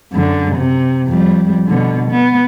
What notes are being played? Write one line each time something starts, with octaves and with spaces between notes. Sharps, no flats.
F#2 D3
C3
F2 G3
B2 D3
B3